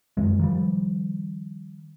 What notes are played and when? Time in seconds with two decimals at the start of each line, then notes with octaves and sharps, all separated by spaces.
0.17 F#2 D#3 G#3
0.39 D#3 F3 G3